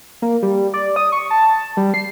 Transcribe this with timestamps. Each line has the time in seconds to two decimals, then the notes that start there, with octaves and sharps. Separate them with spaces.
0.22 A#3
0.42 G3
0.74 D5
0.96 D#6
1.12 C#6
1.31 A5
1.77 G3
1.94 C7